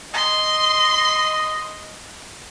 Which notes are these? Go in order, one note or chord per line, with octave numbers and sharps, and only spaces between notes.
D#5 C6